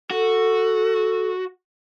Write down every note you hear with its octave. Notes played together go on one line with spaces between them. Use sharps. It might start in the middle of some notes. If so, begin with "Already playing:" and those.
F#4 A4